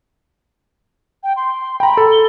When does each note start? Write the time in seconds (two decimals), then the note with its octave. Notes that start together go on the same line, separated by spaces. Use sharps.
1.23 G5
1.36 C6
1.80 G5 A#5 B5
1.97 A4
2.12 G7